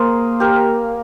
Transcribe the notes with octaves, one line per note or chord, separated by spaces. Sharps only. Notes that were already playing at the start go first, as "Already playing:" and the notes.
Already playing: A#3 G#4 A#4 C5
G4 A#4